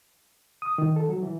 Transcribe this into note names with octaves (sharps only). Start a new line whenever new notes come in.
D#6
D#3
A4
F#3
E3